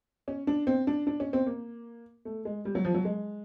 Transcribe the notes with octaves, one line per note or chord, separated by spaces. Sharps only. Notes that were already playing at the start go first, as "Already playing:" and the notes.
C#4
D4
C4
D4
D4
C#4
C4
A#3
A3
G#3
G3
F#3
F3
F#3
G#3